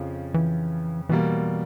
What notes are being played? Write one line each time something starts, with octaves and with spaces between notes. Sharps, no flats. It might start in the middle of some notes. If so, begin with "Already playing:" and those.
Already playing: F2 C#3 F3
E3
B2 E3 G3 A#3